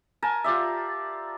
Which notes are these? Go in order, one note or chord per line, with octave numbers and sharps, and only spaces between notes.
A#4 G#5 A5
F4 G4 D5 E5